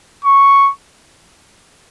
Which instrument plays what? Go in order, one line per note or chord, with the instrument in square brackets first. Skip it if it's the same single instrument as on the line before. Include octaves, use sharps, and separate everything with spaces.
[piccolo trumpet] C#6